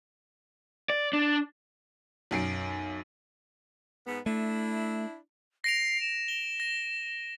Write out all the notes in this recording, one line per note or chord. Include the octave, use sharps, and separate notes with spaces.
D5
D4
B1 F#2 C7 D7
G#2 B3
A3 D4 E4
A#6 C7 D7 F7
E7
G7
A#6